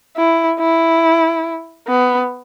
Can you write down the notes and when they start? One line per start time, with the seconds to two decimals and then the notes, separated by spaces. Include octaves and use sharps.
0.16 E4
0.59 E4
1.88 B3